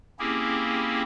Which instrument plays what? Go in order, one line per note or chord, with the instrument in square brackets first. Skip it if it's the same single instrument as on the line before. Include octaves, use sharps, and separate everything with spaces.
[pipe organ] A#3 C4 C#4 E4 G4 G#4